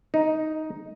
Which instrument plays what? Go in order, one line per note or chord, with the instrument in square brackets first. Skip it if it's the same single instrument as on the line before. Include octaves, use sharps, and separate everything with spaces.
[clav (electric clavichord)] D#4